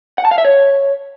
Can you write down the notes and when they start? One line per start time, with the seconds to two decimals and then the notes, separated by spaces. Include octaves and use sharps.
0.18 F#5
0.25 A5
0.31 F5
0.38 E5
0.45 C#5